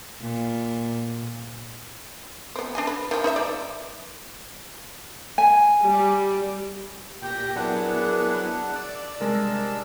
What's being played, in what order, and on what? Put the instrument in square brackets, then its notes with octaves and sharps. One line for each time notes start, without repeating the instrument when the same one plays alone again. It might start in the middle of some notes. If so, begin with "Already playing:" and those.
[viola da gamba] A#2
[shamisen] B3 C4
D4 D#5 G#5
B4
D#3 F3
D#4 B4 E5
D5
[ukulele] G#5
[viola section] G3
[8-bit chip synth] A#2 G4 A#6 [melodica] G5
[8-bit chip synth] F#3 B3 E4 [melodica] D4 F#5 [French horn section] G#4 A#4
[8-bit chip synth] D5 [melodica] E6
[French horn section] C3 G3 [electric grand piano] G#3 A#4 [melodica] D4 D5 [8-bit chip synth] E6